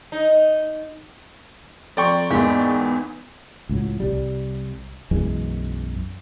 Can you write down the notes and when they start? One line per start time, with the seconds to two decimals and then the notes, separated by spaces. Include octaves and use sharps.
0.12 D#4
1.97 F2 D5 G5 A#5 C6 C#6
2.30 E2 G#2 G#3 A#3 B3 B5
3.69 C#2 A2 F#3
4.00 C2 G3
5.11 B1 F#2 E3 G#3